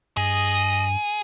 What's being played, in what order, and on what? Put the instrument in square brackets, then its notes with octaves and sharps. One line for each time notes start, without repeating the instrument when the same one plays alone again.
[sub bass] G2 [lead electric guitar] G#4 [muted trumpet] D#5